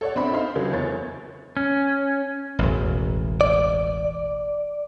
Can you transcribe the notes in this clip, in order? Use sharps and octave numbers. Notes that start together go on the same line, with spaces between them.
A4 C#5 D5 F#5
A#1 C4 D4 B5
D#4 C5 F5 B5
C#2 D3 F#3
F#1 E2 C#5 A6
C#4
E1 A1
D5